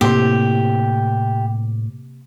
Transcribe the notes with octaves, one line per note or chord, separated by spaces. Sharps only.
A2 C3 A#3 C4 G4